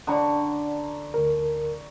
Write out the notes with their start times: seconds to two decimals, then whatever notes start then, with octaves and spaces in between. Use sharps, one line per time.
0.07 D3 D5 F#5 A#5 C#6
1.14 D2 A#4